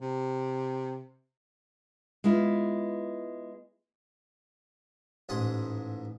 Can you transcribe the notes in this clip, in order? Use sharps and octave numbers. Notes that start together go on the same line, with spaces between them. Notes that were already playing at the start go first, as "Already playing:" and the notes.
C3
G#3 B3 E4 F4
A1 G#2 G#4 F#5 C6 D#6